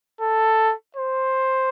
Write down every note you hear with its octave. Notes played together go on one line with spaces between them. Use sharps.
A4
C5